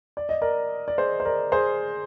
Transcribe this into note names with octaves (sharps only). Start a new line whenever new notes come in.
D5
D#5
A#4 D5
D5
G#4 C5
C5
A#4 D5
G#4 C5